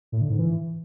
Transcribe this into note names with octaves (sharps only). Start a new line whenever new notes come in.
A2
D3
G#2
E3